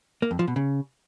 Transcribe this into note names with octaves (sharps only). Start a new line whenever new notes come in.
A#3
F2
F3
B2
C#3